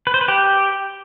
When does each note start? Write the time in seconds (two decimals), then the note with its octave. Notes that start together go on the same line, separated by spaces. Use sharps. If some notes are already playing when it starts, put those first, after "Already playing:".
0.07 B4
0.14 C5
0.21 B4
0.28 G4